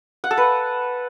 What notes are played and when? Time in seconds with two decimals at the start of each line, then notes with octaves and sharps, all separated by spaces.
0.24 F#5
0.31 A4
0.37 B4